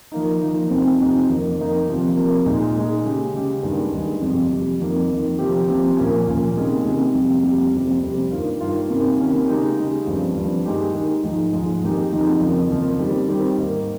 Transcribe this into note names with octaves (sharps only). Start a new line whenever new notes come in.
F3 A#3 D#4
F3 A#3 D#4
F2 C3 F3 C4 D#4
F2 C3 F3 C4 D#4
F2 D#3 A#3 D#4
F2 D#3 A#3 D#4
C3 F3 A#3
C3 F3 A#3
A#2 G#3 D#4
A#2 G#3 D#4
C#3 G#3 C#4 G4
C#3 G#3 C#4 G4
G2 D#3 G#3
G2 D#3 G#3
F2 C3 G3
F2 C3 G3
F2 D#3 A#3
F2 D#3 A#3
C3 F3 C4 G4
C3 F3 C4 G4
A#2 F3 A#3 C#4
A#2 F3 A#3 C#4
C3 D#3 G#3 C#4
C3 D#3 G#3 C#4
F2 C3 G3
F2 C3 G3
F2 C3 G3 C4
F2 C3 G3 C4
G2 D#3 A#3 F4
G2 D#3 A#3 F4
C3 D#3 A#3 C#4
C3 D#3 A#3 C#4
C#3 G#3 D#4 G4
C#3 G#3 D#4 G4
G2 F3 C4
G2 F3 C4
D#3 G#3 D#4 G4
D#3 G#3 D#4 G4
G#2 F3 G#3 D#4
G#2 F3 G#3 D#4
F2 D#3 G#3 D#4 G4
F2 D#3 G#3 D#4 G4
F2 C#3 F3 A#3
F2 C#3 F3 A#3
D#3 G3 C4
D#3 G3 C4
G#2 D#3 A#3